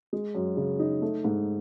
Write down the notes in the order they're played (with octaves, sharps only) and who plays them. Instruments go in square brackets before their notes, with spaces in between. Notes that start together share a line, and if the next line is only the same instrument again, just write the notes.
[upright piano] G#3
F#2
C#3
D#4
A3
G#2